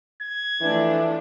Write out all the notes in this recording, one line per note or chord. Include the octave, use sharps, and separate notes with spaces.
G#6
E3 F3 A3 D4